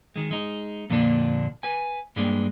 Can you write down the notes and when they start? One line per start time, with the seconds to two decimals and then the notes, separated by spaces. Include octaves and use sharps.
0.16 D#3 G#3
0.31 G#3 D#4
0.90 F2 A#2 D3 A#3 D4
1.63 B4 G#5
2.16 G2 G3 G#3 A#3 D4